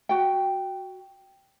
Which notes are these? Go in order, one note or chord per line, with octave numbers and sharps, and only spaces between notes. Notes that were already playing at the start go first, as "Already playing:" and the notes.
F#4 G5